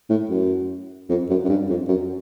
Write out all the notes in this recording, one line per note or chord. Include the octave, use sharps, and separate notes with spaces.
A2
F#2
F2
F#2
F#2
G2
F2
F#2